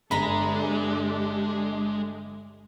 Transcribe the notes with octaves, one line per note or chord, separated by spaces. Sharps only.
G1 G#3 D4 G4 A4 A#5 B5